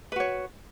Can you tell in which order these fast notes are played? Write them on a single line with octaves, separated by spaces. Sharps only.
B4 F#4 C#5